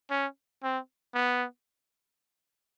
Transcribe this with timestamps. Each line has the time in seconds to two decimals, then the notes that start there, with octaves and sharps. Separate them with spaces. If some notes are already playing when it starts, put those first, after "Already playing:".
0.10 C#4
0.63 C4
1.14 B3